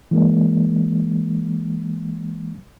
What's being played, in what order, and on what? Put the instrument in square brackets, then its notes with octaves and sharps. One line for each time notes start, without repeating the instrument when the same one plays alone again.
[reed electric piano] E3 G#3 A#3